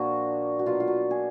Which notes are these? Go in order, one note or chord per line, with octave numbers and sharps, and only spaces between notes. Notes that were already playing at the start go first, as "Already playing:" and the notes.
Already playing: A#2 F3 A#3 D4 F#4
F#4
B2 F#3 A#3 F4
F4
F#4
G#4